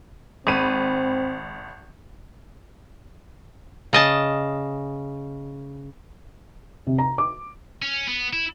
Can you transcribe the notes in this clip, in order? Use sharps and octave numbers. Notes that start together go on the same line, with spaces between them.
G#1 C4 B5 D#7
C#3 D#5 A5
C3
A#5
D6
C#4
B3
E4